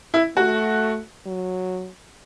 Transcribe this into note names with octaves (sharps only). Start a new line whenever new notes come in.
E4
A3 F#4
F#3